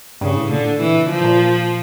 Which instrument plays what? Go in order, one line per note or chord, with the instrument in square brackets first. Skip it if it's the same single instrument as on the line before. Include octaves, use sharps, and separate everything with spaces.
[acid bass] G2 [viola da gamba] C#3
[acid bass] A2
[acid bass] A#2 [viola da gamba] D3
[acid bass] A2
[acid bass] A#2 [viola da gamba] E3
[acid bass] C#3
[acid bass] D3 [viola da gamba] F3
[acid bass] A2
A#2